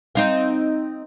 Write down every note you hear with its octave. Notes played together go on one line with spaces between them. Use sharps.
C4 D#4 F5